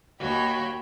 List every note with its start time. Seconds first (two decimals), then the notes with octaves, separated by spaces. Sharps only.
0.20 D#2 F#4 C#5 G5 B5